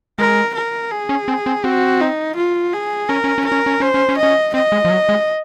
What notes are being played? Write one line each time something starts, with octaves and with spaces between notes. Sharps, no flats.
G#3 A#4
A#4
G#4
C#4
C4
C4
C4 F#4
D#4
F4
G#4
C#4 A#4
C#4
C#4
A#4
C#4
C#4
C#4 C5
C#4
C#4
D#5
C#4
C4 D#5
G#3
F3
F#3
G#3